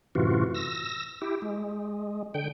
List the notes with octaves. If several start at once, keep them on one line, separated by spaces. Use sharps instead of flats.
F#2 A2 C3 E3 F4 F#4
E6 A#6
E4 G4
G#3
D3 G5